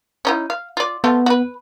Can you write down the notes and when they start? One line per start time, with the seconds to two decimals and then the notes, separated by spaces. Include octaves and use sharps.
0.25 C#4 D#4 E4
0.50 F5
0.77 F4 D5
1.04 F3 A3 B3 F4
1.26 F#4 B4